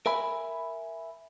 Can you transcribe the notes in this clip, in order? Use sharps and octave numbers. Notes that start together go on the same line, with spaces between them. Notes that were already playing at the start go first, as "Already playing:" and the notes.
A#4 E5 G#5 B5